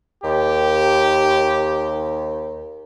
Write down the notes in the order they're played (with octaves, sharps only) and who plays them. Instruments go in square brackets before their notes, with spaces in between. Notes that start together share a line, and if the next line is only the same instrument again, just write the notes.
[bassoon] D#2 [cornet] G4